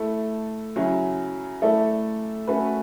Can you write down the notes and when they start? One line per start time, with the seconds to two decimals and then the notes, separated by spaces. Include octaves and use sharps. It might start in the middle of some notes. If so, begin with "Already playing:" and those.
Already playing: A3 E4 A4
0.76 C#3 F#3 C#4 E4
1.62 A3 E4 A4 D5
2.47 A3 C#4 F#4 B4